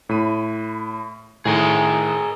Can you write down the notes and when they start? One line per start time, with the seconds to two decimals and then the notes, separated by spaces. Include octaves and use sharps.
0.09 A2 B5 D#7
1.45 A2 D#3 G#4 A#4 D#5